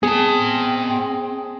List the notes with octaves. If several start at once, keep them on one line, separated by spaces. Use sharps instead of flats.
B3 C4 G#4 A5